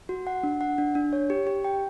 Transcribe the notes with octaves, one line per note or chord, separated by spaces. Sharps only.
F#4
F#5
D4
F#5
D4
D4
C#5
G4
G4
G5